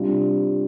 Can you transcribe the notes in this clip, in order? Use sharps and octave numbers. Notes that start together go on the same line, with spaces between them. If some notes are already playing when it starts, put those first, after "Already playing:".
Already playing: C3 G3 D4 F4